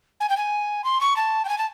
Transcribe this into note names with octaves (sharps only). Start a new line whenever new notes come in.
G#5
G5
G#5
C6
C#6
A5
G5
G#5
A5